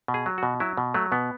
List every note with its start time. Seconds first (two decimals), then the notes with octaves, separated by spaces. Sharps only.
0.08 B2
0.14 G#4
0.26 F#3
0.38 B2 F#4
0.60 F#3 E4
0.77 B2
0.94 F#3 A3
1.12 B2 B3